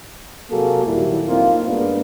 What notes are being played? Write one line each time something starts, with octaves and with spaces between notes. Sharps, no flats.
C3 F#3 A#3 F#4 G#4 A4
D#2 A#2 F#3 G3 A#3 E4
A#3 C4 D#4 F4
G2 G#3 A#3 B3 D4